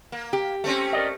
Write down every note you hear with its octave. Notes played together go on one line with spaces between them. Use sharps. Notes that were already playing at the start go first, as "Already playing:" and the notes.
A#3
G4
A3 C4 C#4
A#4 D5 D#5